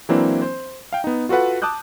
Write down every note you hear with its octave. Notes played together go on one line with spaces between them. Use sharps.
E3 F#3 A#3 C4 D4 E4
C5
F5 G5
B3 D#4
F4 F#4 A4 B4 F#5
A5 D6 D#6 F#6 G6